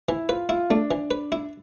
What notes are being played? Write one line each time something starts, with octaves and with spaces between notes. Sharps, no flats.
E3 E4
F4 B4
E4 F4
A3 D4
E3
B4
E4